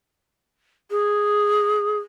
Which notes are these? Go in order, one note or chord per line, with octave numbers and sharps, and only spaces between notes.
G#4